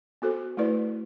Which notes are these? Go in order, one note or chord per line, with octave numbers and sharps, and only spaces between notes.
B3 F#4 A4 C5
A3 E4 B4 D5